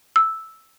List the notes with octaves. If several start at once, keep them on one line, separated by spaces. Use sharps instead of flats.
E6